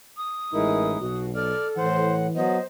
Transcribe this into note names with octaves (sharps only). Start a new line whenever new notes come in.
D#6
A1 G#3 D#4 E4 A#4
B1 B2 F#4
A4 D5 F6
A2 E3 C5 F#5
F#3 B3 C5 D#5